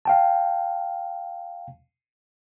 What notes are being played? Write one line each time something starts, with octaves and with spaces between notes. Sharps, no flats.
F5 G5 A5